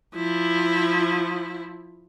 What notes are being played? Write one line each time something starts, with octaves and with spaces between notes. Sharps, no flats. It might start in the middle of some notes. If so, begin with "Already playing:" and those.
F3 E4